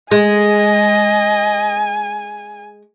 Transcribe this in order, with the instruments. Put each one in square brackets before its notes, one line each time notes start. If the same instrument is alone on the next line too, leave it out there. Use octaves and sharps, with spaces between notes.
[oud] G#3 [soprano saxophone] D#5 [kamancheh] G#5